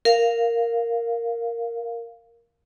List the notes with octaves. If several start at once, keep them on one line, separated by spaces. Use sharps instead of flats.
A#4 F5